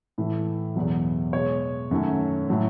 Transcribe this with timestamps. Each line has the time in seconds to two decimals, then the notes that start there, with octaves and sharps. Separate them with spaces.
0.18 A2 E3 A3
0.76 E2 B2 F#3
1.33 B2 G#3 C#5
1.91 F#2 D#3 F#3 A3
2.49 A2 F#3 A3